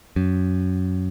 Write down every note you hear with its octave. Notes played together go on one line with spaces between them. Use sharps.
F#2